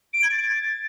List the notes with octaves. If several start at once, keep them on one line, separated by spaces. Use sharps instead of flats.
D7
G#6
A6